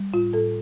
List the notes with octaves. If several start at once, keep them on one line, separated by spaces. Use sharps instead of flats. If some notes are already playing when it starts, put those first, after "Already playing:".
Already playing: G3
A2 F4
A2 A4